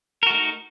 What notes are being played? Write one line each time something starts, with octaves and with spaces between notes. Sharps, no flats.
A3 D#4 F#4 A#4